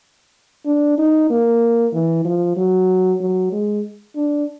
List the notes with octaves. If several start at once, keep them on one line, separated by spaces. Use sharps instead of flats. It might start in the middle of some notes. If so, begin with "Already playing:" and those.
D4
D#4
A#3
E3
F3
F#3
F#3
G#3
D4